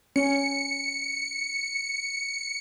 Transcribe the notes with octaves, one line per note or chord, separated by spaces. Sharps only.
C#4 C#7